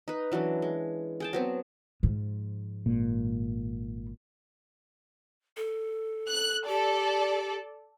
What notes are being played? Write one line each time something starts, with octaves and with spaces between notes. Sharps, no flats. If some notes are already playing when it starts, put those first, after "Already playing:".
D#4 B4
E3 F#3 C#4 D4
G#3
G#4 G5 A5
F#3 B3 C4
G#2 F3
G#1 A#2
A4
F#6
G4 A4 D5